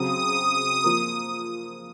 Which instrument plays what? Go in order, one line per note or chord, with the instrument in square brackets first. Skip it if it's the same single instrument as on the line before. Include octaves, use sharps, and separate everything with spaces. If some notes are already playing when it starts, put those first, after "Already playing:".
Already playing: [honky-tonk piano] C#3 F#3 C4 [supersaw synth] D#6
[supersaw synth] D#6
[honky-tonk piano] F3 A#3 F4 A#4